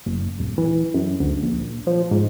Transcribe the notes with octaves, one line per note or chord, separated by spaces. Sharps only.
F#1
D#1
E3
F#2
D2
A#1
F3
G#2